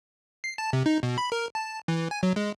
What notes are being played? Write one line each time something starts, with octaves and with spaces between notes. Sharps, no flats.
C7
A5
C3
D#4
B2
B5
A#4
A5
E3
G#5
F#3
G#3